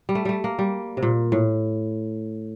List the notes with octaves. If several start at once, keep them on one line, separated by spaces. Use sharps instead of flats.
G3
A3
G3 A3
A#3
G3
C3
A#2
A2